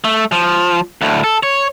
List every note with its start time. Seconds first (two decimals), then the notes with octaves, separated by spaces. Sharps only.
0.04 A3
0.32 F3
1.01 D2 A2
1.24 A4
1.43 C#5